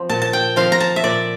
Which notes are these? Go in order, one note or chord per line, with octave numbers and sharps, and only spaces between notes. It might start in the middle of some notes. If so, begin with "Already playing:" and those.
Already playing: F3 C4
A#2 A5
A5
G5
F3 C4 F5
A#5
A5
E5
A#2 D5